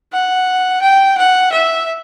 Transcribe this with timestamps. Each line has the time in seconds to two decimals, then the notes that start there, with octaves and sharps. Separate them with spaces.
0.12 F#5
0.82 G5
1.18 F#5
1.52 E5